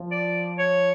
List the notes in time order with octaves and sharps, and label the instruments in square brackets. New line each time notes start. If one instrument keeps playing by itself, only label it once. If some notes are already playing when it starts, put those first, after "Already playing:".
Already playing: [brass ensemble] F3
[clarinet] D5
C#5